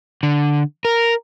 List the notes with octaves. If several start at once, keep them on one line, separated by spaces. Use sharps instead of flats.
D3
A#4